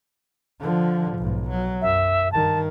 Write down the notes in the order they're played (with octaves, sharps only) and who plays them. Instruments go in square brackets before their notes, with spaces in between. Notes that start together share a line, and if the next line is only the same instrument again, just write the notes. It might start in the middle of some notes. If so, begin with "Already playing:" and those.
[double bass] D3 F3
B1 G#2
F#3
[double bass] F#2 [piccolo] E5
[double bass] G2 D#3 [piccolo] A5